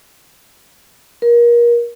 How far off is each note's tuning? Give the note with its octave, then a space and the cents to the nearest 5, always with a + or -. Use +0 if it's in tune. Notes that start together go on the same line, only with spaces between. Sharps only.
A#4 +30